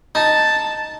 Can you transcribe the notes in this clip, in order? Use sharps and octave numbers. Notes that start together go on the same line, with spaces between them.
D#4 A5